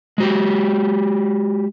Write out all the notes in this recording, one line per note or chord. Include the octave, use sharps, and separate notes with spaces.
G#3 F#4 G4